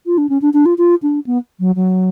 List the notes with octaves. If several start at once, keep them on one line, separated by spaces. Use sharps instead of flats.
F4
D4
C#4
D4
D4
F4
F4
D4
B3
F#3
F#3